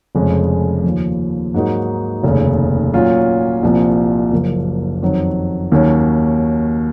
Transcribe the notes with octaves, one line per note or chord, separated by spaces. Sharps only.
F1 F2 C#3 G#3
D#2 C#3 F3
G#2 F#3 A#3 D#4 F#4
F1 D#2 C#3
A#2 F#3 C#4 F4
C2 A#2 F3 C4
F#1 F#2 F3 A#3
F2 D#3 F#3
D#2 D#3 F#3 C#4